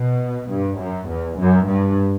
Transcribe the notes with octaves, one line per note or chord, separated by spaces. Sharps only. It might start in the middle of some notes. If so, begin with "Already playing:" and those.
Already playing: B2
G2
F#2
E2
F#2
G2